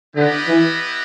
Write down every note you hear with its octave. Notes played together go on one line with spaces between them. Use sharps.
D3 B3 E4 G4 B4 D#5
E3